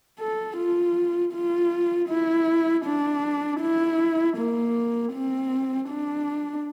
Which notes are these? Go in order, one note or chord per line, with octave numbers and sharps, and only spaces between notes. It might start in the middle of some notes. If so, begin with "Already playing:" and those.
A4
F4
F4
E4
D4
E4
A#3
C4
D4